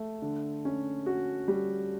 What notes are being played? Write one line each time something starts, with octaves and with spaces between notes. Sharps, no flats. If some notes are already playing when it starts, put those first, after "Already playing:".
Already playing: A3
D3
C#4
F#4
G3